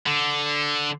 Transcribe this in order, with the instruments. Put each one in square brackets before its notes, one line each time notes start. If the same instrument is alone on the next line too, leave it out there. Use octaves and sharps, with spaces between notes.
[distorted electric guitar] D3